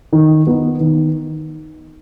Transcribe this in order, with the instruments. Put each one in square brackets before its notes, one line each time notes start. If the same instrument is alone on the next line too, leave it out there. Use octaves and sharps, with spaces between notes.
[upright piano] D#3
B3 D#4
D#3